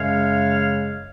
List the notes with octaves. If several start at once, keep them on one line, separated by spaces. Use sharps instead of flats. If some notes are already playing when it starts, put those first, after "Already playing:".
Already playing: F#2 C#3 G#3 C#5 F5